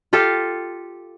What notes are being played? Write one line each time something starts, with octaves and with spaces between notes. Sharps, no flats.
F4 G4 A4 F5